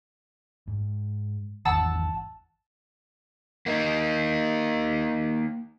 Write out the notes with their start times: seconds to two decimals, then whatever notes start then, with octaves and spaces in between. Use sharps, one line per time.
0.68 G#2
1.65 G#1 E2 F#5 A5 E6
3.66 A#3 D#4